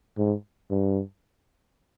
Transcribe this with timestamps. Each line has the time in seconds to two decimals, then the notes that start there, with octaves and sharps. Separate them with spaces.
0.18 G#2
0.71 G2